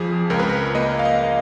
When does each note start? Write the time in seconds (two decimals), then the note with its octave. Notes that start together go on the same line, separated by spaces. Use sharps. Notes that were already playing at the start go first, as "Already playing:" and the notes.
Already playing: F2 F3 G#4
0.30 C#2 A#4
0.39 B4
0.49 A#4
0.75 A#3 D#5
0.99 F5
1.05 D#5